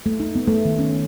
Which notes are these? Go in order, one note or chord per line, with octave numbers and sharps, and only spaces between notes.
A3
D#4
B3
A3
D#3
C#4